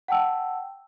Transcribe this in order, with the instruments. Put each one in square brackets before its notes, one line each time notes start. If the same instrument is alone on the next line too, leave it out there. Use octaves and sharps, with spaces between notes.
[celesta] F#5 G5 A5 E6